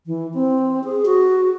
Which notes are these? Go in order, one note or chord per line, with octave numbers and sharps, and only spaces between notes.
E3
C4
G#4
F#4